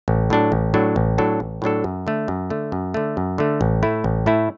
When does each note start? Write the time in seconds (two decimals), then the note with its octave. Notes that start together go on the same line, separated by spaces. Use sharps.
0.08 A1
0.30 A2 F#3 D4 A4
0.52 A1
0.74 A2 F#3 D4 A4
0.96 A1
1.18 A2 F#3 D4 A4
1.40 A1
1.62 A2 F#3 D4 A4
1.84 F#2
2.07 D3 A3
2.28 F#2
2.50 D3 A3
2.72 F#2
2.94 D3 A3
3.17 F#2
3.38 D3 A3
3.61 A1
3.83 A2 A3 E4
4.04 A1
4.26 A2 A3 E4